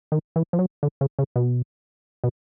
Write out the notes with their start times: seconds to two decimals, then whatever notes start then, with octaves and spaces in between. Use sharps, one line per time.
0.12 D#3
0.36 E3
0.53 F3
0.59 F#3
0.83 D3
1.01 C#3
1.19 C#3
1.36 B2
2.24 B2